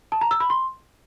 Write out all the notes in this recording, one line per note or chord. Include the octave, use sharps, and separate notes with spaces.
A5
A#5
E6
B5
C6